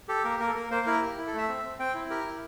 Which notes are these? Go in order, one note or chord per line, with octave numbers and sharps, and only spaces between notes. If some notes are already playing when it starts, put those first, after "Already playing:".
G4 A4
A#3 A#4
A#3 A#4
A4
A#3 A#4
A#3 C5
E4 A#4
G4
E4
A4
A3 E5
C4
C4
C4 G5
E4
G4 A#4
E4